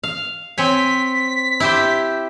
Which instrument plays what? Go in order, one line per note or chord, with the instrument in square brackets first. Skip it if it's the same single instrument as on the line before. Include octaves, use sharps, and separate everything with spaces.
[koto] F5
[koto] C4 C#5 G#5 [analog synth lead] B6
[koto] E4 G4 C5